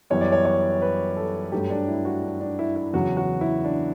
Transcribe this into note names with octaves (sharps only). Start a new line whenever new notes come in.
F#2 E3 G3 B3 C#5
D5
C#5
C#5
B4
A4
G2 F#3 A3 G4
D4
E4
F#4
D4
D4
E4
E4
E2 C#3 F#3 F#4
F#4
E4
D4